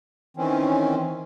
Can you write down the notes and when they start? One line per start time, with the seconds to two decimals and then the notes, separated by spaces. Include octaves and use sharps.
0.37 D#3 E3 C4 C#4